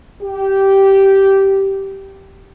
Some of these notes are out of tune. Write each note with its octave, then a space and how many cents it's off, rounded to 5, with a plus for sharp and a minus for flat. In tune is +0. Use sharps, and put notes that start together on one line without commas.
G4 -10